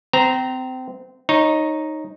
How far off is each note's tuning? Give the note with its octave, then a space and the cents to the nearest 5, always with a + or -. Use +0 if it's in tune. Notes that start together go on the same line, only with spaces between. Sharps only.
C4 -25 A#5 -5
D#4 +0 C#5 -15